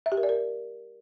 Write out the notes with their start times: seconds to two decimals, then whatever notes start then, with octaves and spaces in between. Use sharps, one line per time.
0.06 E5
0.12 G4
0.17 A#4
0.23 D5
0.29 A#4